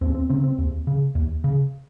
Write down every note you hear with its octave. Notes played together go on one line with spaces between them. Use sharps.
D#2 C4
C4
C#3 C4
C4
D#2
C#3
D#2
C#3